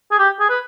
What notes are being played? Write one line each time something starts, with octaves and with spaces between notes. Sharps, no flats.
G#4
G4
G#4
B4